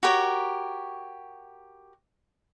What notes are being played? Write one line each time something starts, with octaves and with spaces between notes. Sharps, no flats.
F#4 G4 A#4 C#5